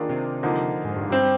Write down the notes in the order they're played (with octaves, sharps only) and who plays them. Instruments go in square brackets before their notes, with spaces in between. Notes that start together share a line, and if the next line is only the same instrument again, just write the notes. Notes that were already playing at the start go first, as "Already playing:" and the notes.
Already playing: [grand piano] D#3 A#3 D4 F4 G#4
[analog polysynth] C3
[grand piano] D3 F3 A#3 D#4
[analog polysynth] G#2
G2
G#2
[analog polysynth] G2 [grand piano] G3 C4 G4